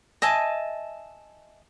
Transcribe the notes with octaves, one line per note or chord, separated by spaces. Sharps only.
D#5 E5 G#5 A5